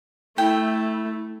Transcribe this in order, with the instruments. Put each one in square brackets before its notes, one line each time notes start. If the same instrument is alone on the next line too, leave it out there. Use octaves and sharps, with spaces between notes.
[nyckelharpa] A3 [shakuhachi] E4 [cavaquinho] G5